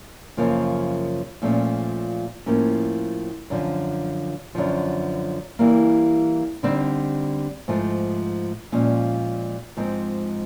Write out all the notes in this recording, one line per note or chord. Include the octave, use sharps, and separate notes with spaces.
F#2 C#3 F3 A#3
A#2 F3 A3 C#4
A2 F3 A#3 C#4
F#2 D3 F3
F#2 D3 F3
E3 G3 A#3
D3 G3 C4 D#4
G#2 F3 A3
A#2 F3 G#3 C#4
G#2 F3 G#3 C4